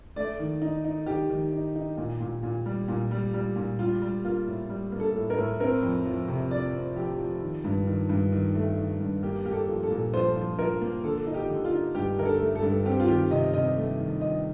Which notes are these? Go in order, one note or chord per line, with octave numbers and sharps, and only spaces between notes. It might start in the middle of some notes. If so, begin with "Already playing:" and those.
A3 D5
D#3
D#4
D#4
D#3 G4
D#3
D#4
D#4
A#2
A#2
A#2
G3
A#2
G3
G3
A#2
G3 F4
G3
A#3 F4
A2
G3
A#3
A4
A2
A#4
A2
C4 A#4
F2
F3
C3
F3 D5
C4
F2 G4
F3
D#3
G2
D#3
G2
D#3
A3
D#3
G2
A#3 G4
A#3 G4
A4
F3
A4
A#2
F3 C5
F3
F3 A#4
A#3
D3 A4
D#4
G4
D3
F4
D#4
G2 G4
D3 A#4
A4
A3
A4
G2
C4 G4
F4
D#3 G4
C3 D#5
C3 D#5
A3
D#3
D#3 D#5